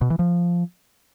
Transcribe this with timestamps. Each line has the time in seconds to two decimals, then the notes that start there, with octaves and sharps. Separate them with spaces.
0.01 B2
0.10 E3
0.19 F3